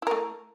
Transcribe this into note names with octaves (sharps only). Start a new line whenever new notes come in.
A3 E4 A#4